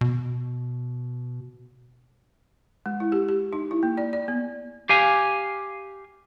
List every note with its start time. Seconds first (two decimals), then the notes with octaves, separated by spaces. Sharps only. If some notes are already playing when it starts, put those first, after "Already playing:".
0.01 B2
2.86 G#3
3.00 E4
3.12 G4
3.28 G4
3.53 D#4
3.71 E4
3.83 A#3
3.97 D5
4.13 D5
4.28 B3
4.89 G4 F5 G#5